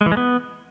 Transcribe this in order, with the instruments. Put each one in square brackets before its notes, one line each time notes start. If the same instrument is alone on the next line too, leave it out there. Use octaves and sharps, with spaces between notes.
[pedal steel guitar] G#3
E3
G#3
B3